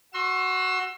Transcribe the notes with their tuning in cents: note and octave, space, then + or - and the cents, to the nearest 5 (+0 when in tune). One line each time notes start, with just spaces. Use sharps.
F#4 +0 C6 +35 E6 +15